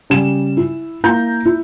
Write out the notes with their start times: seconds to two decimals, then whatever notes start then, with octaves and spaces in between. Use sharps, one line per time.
0.10 C#3 G3 E7
0.57 E4
1.04 A#3 E4 A#5 G6
1.45 E4